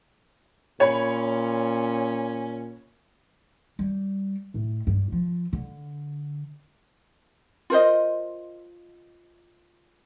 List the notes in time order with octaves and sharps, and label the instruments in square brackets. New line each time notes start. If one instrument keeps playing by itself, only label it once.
[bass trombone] A#2 [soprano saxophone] C#4 [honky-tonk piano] C#5 B5
[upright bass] G3
A2
G2
F3
D3
[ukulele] F4 A#4 C5 D#5